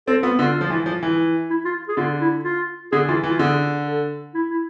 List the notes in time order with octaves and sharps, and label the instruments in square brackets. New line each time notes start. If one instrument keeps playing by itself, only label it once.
[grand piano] C4 [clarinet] A4
[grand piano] B3 [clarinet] F4
[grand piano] D3 [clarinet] F4
[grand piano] F3
E3
F3
E3
[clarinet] E4
F4
G#4
[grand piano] D3 [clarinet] F4
[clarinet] E4
F4
[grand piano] D3 [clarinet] G#4
[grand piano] E3 [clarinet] F4
[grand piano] E3
[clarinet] F4
[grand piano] D3 [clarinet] G#4
[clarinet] A4
E4
E4